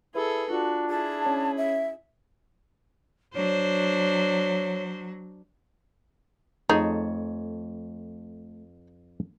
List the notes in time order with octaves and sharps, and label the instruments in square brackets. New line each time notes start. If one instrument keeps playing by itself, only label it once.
[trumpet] E4 [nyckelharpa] G#4 A4 [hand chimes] B4
[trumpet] D4 [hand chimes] F4 [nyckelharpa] F#4
[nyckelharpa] E4 G#4 [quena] A5
[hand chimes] C#4 C#5
[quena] E5
[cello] F#3 [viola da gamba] D4 C5 [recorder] C#5
[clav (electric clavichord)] F2 C#5 A5 [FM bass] A3 [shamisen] D#4 G#4